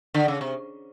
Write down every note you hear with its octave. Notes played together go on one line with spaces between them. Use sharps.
D3
C#3
C3